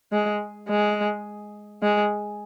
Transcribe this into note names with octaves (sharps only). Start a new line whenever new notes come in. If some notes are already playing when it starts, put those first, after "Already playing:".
G#3
G#3
G#3